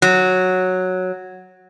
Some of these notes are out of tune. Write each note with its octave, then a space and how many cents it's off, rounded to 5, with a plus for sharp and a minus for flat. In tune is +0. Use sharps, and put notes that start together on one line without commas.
F#3 -5